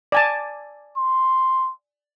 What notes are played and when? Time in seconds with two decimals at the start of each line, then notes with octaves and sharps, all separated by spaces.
0.12 D5 G#5 A5
0.96 C6